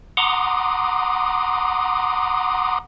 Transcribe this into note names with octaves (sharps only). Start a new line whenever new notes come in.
F#5 A#5 C6 D6 D#6